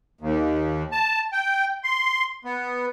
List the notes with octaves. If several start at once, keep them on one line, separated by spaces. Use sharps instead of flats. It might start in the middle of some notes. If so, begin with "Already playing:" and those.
D#2
A5
G5
C6
B3